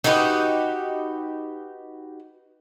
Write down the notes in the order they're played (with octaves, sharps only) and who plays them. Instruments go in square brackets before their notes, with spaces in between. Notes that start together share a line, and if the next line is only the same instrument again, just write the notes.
[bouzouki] D#4 F#4 G4 B4